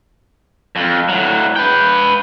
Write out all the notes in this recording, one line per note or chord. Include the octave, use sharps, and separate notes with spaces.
F2
A2 F#3
B4 G5